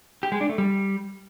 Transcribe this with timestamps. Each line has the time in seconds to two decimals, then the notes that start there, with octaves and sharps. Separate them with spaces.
0.23 G4
0.32 G#3
0.41 D4
0.49 A3
0.58 G3